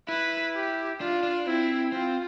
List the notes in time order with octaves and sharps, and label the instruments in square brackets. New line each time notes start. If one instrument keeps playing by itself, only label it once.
[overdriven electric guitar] E4 [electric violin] B4
[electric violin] G4
[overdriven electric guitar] D4 [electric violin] F4
[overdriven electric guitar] D4
[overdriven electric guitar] C4 [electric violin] E4
[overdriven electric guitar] C4 [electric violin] F4